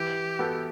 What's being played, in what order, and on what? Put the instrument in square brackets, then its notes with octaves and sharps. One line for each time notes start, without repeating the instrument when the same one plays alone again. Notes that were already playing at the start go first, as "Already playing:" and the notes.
Already playing: [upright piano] E3 [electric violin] G4
[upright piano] B3 F#4 A4